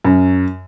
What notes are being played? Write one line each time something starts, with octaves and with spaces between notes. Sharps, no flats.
F#2